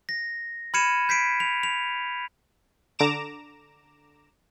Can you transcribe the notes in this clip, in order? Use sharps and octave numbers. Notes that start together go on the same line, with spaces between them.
A#6
B5 F6 G#6 C#7 D#7 E7
G6 B6 C7 D7
F7
F7
D3 A#5 D6 E7